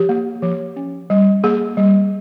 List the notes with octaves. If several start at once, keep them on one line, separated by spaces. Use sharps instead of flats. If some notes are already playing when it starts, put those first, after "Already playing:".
Already playing: F3 G4
A#3
F3
C#4
G3
A#3 G#4
G3